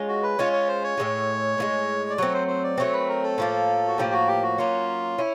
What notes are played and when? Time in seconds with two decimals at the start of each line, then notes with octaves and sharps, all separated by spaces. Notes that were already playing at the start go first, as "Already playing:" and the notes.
Already playing: G#3 C#4 F4
0.08 F#4
0.23 B4
0.39 G#3 C#4 F4 C#5
0.53 C#5
0.68 C5
0.84 C#5
0.98 A2 F3 G#3
1.58 A2 F3 G#3
2.10 D5
2.18 F#3 A3 C4 C#5
2.34 C5
2.48 C5
2.64 D5
2.78 F#3 A3 C4 C#5
2.93 B4
3.09 A#4
3.23 A4
3.38 A2 F3 A#3
3.88 F#4
3.98 A2 F3 A#3 G4
4.13 F#4
4.28 G4
4.43 F#4
4.58 F#3 A#3 C#4 F4
5.18 C#4 E4